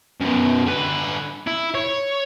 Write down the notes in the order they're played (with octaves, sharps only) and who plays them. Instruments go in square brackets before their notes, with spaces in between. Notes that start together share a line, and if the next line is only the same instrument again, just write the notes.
[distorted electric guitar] F#2 B2
D3 B4
E4
C#5